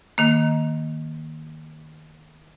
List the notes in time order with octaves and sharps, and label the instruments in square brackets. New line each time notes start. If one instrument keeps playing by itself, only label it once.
[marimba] D#3 A#3